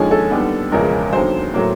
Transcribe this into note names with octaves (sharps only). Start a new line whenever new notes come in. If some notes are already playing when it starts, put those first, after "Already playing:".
Already playing: D#2 D3 F3 G#3 C#4 G#4
A4
D#2 D3 G3 B3
E1 E2 C#3 F3 G#3 A#4
D#2 D3 F#3 C5
A2 F#3 A#3